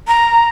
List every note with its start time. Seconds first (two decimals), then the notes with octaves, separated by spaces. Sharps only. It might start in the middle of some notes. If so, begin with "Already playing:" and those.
0.08 A#5